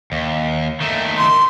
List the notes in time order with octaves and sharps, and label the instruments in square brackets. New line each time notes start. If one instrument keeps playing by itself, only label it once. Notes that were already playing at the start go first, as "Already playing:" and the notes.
[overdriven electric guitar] D#2
D#3 A3
[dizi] C6